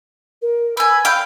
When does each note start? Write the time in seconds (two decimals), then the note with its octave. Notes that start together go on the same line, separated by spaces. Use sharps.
0.41 A#4
0.77 B4 G#5 E6
1.05 F5 G5 B5